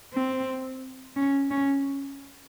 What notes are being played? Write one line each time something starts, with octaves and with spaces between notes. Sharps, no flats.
C4
C#4
C#4